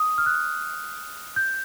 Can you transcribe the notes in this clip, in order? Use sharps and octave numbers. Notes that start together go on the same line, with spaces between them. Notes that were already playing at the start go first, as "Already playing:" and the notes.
Already playing: D#6
F6
F#6
G6